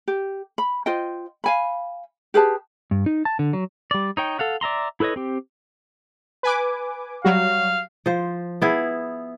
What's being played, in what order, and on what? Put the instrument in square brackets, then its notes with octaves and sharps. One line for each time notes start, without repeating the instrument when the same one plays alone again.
[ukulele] G4
B5
F4 C5 D#5 G5
F5 G#5 B5
G4 G#4 B4 A5
[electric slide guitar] G2
D#4
A5
D3
F#3
[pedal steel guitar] G3 D5
D#4 C#5 G5
A4 F5 F#5
D5 E5 A#5 C6
E4 A4 B4 C#5 D#5
C4 G4
[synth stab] B4 G#5 D6
[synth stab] F#3 G3 F#4 [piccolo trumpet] F5
[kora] F3 C5
B3 E4 G#4